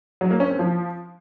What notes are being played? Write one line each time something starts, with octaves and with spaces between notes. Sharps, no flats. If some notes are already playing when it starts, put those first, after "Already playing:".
F#3
A#3
C#4
C4
F3